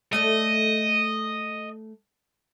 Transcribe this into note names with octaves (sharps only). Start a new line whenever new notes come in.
A3 A4 D5 D#5